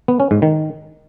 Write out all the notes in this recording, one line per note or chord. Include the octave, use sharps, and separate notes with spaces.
B3
C#4
G#2
D#3